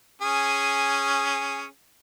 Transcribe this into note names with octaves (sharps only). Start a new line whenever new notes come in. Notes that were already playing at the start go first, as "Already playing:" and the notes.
C#4 G#4